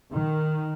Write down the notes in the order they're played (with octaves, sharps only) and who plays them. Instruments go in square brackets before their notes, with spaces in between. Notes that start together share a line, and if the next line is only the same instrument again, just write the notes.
[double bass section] D#3